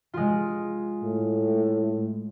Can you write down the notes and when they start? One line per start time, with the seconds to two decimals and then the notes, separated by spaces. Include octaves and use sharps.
0.13 G#3 F4
1.03 A2